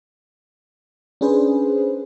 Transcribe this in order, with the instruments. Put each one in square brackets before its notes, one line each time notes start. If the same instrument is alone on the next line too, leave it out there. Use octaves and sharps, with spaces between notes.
[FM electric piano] C#4 D4 G#4 B4 C5